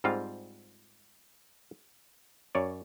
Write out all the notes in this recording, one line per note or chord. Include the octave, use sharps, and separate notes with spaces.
G#2 G3 C4 F4 F5
F#2 C#5 D5